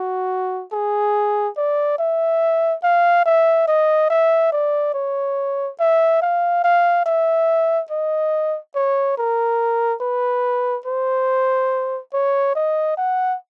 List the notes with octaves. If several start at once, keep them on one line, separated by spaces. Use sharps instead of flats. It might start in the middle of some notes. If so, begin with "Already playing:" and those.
Already playing: F#4
G#4
D5
E5
F5
E5
D#5
E5
D5
C#5
E5
F5
F5
E5
D#5
C#5
A#4
B4
C5
C#5
D#5
F#5